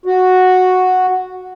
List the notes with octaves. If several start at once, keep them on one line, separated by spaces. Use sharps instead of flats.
F#4